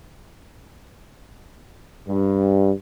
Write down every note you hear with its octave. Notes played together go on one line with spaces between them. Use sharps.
G2